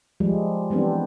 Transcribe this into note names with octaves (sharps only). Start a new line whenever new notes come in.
F3 G3 G#3
E3 G3 B3 C4 D4